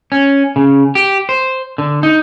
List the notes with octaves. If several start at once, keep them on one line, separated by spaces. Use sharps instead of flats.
C#4
C#3
G4
C5
D3
D#4